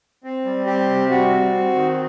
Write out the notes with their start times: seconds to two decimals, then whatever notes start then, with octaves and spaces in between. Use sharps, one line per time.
0.24 C4
0.45 G3
0.66 C4 G4
0.88 C3
1.09 G3 F#4
1.31 C4
1.52 C4
1.75 D#3